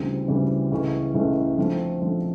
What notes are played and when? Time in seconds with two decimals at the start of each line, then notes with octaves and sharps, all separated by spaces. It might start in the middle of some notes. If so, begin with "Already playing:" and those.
Already playing: D2 C#3 E3 G3 C4
0.28 D2 C#3 E3 G3 C4
0.71 C#2 C#3 E3 A3 C#4
1.14 C#2 C#3 E3 A3 C#4
1.58 D3 F3 A3 C4
2.01 D3 F3 A3 C4